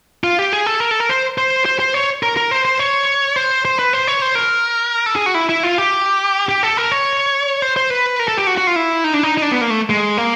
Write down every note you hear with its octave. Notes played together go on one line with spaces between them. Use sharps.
F4
G4
G#4
A4
A#4
A4
A#4
C5
C5
C5
C5
C#5
A#4
A#4
C5
C5
C#5
C5
C5
B4
C5
C#5
C5
A#4
A4
G#4
F#4
E4
E4
F4
G4
G4
A4
A#4
C#5
C5
C5
B4
A#4
A4
G4
F#4
F#4
F4
E4
D#4
D4
D#4
D#4
D4
B3
A#3
A3
G#3
A#3